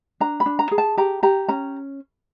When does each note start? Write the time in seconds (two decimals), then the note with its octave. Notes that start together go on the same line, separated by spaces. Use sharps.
0.20 D4 A#5
0.40 B5
0.46 D4
0.59 A#5
0.71 G#4
0.78 A5
0.97 G4 A#5
1.23 G4 A#5
1.48 C#4 A#5